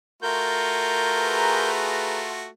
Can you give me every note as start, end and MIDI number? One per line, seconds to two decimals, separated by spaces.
0.22 2.47 57
0.22 2.47 65
0.22 2.47 66
0.22 1.69 70
0.22 1.69 91
1.15 2.25 68
1.15 2.25 71
1.15 2.25 82